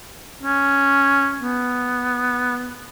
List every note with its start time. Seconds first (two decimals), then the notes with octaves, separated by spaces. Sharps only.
0.43 C#4
1.42 B3